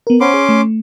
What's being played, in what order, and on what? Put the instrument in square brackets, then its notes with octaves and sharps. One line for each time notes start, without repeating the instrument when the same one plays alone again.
[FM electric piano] B3 A#4
[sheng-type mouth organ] C#4 C6 D6 [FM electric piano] C5 F#5 B5
[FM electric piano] G#4
A3